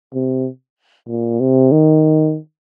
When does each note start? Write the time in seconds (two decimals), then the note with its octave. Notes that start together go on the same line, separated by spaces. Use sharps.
0.14 C3
1.08 A#2
1.40 C3
1.72 D#3